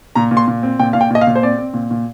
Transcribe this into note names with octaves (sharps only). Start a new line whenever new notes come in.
A#2 A#5
A#2
C6
A#2
C4
A#2 G5
A#2 F5
G5
A#2 D#5
F5
A#2
C5
C4 D5
C4
A#2
A#2